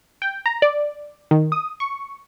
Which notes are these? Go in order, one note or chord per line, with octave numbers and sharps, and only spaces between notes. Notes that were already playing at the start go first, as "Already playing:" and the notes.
G5
A#5
D5
D#3
D#6
C#6